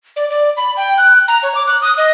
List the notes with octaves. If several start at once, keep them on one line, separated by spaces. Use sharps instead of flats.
D5
D5
B5
G5
F#6
A#5
C#5
D6
F#6
D#6
D#5